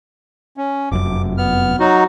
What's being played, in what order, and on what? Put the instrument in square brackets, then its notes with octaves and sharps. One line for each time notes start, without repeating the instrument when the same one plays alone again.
[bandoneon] C#4
[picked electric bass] F1 F#2 [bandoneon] D6
[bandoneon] B3 F6
F#3 D#4 F#4